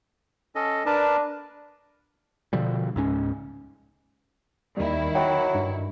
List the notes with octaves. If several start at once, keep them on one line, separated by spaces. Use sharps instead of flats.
C#4 A4 D#5
D4 A#4 B4 A5
B2 D3 F3 G3
C#2 G#2 C#4
D#2 D#3 G3 E4
F#3 G5
G2